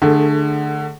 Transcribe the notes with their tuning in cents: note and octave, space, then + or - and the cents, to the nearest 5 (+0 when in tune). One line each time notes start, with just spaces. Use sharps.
D3 +25 A3 +0 G#4 +0